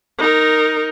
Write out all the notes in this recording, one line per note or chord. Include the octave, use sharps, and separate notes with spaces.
D#4 A#4